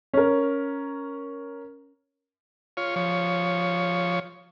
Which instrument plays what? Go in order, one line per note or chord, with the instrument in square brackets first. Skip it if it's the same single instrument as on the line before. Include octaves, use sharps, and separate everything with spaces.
[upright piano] C#4 A#4
[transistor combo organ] F4 C#5
F3 C#5